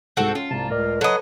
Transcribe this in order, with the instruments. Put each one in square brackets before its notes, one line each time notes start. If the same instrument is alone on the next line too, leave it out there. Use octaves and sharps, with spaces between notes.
[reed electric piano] C2 G#2 [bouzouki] C4 F#4 A4
[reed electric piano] C#4 [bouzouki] F4
[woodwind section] C2 A#3 A5 [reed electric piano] G#2 C3
[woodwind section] C#2 A#4 [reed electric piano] A2 D5
[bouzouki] F#3 D#5 [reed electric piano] A4 [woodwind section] B4 C#5